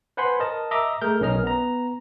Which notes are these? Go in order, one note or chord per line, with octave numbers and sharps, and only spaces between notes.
B4 C5 F#5 G#5 B5 C6
A#4 D#5 A5
D#5 E5 A#5 D6 D#6
A3 G#4 A#4 G6
B1 C#4 A#4 D#5 F6
B3 A#5